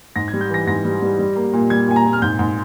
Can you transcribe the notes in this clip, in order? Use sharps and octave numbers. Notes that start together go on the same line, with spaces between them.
G#2 A#6
G#6
G3
G6
E3 A#6
G#2 A#6
G3
G3
G3
A#3
A#2
G3 G#6
A#2 G#5
A#5
A#2
F6
G#2 G6
G#2